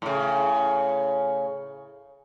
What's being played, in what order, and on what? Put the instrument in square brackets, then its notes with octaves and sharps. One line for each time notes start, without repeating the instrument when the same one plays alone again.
[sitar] A2 C#3